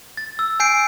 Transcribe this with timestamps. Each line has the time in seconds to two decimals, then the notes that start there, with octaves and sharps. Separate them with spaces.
0.17 A6
0.39 E6
0.60 G#5 G6 C7 D7